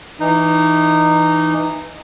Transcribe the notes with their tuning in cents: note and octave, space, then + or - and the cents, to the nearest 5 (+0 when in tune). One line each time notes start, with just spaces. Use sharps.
E3 +0 D#4 -15